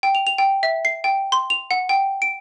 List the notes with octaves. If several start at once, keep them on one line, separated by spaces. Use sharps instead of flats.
G5
F7
F7
G5
E5
C7
G5
C6
F7
F#5
G5
D7